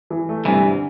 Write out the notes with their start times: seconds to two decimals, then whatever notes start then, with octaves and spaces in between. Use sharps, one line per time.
0.10 E3
0.29 A3
0.45 G2 C3 E3
0.63 D3